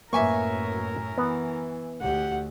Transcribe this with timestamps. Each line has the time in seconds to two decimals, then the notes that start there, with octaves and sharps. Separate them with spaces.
0.13 F#2 A2 A#3 A#4 B4 E5 G#5 C#6
1.18 E3 B3
2.01 D2 G4 F#5